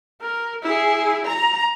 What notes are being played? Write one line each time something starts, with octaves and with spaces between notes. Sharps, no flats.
A#4
E4 G#4
A#5